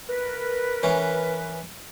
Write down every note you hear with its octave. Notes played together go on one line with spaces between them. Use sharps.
A#4 B4
E3 C#4